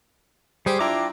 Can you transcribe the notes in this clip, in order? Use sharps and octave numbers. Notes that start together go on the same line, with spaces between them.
G3 G4 G#4 C5
D4 E4 F4 G5 A#5 D6